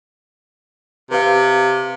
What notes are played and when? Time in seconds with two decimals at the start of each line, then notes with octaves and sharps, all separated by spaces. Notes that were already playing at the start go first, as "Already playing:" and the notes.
1.11 C3 B4 F5